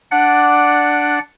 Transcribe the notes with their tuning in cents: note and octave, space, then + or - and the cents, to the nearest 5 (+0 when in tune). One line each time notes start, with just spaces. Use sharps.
D4 +0 D5 +0 F#5 +0